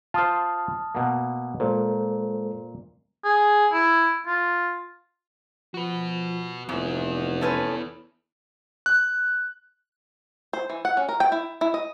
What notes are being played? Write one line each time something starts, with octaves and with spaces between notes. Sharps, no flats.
F4 C5 A5 D#6 F6
B2 A#3
A#2 G#3 A4 C5
G#4
E4
F4
F3 F#4 B4
F1 G#2 B3 E4
A3 C#4 B4
F#6
C5
E3
F#5
C#4
A#4
G5
E4
E4
D#5